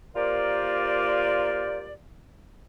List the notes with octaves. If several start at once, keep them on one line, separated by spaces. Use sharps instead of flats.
A#3 F4 G4 A#4 C5 D5